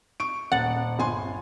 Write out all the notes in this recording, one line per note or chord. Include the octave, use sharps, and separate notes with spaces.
C#6 D7
D#1 F#5 A6
G1 G#5 C6